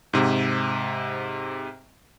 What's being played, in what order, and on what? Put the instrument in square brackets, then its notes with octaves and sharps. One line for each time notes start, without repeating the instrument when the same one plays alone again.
[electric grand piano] G#2 C3